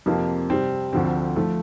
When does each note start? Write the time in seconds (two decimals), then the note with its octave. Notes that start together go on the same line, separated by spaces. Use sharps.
0.06 F2 C3 F3 A#3
0.50 C3 G3 C4
0.93 D2 D3 F3 C4
1.36 F3 A3